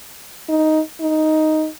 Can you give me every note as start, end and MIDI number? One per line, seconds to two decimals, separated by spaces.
0.49 0.80 63
1.01 1.68 63